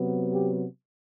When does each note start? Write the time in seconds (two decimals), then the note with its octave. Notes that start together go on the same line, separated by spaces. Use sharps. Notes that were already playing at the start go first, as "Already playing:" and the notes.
Already playing: C3 F#3 B3
0.33 G4